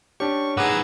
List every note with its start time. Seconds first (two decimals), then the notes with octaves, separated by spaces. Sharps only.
0.20 C#4 D4 G4 C#6
0.57 G#2 G#4 B4 F#5 A#5 D6 E6